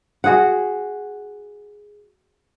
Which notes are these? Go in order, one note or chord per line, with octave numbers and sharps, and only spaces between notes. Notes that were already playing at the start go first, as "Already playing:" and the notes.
F#4 G#4 F#5